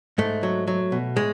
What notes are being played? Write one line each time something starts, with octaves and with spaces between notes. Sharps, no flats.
G#2 A3
F#3
F#3
B2
A2 G#3